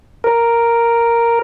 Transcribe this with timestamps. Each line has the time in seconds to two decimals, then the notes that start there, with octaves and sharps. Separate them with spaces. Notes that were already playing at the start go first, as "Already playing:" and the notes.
0.24 A#4